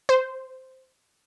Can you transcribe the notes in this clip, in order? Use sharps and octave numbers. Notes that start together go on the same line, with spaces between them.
C5